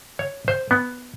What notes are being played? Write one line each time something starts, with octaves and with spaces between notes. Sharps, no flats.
C#5
C5
B3